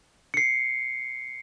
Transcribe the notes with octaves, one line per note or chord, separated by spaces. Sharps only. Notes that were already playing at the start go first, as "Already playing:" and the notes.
C7 C#7